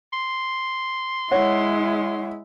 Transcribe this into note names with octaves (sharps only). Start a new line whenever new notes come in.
C6
G#3 E4 C#5 F#5